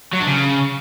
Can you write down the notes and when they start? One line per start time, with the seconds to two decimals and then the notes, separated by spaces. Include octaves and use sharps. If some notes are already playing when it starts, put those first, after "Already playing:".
0.13 F#3
0.21 D4
0.28 C#3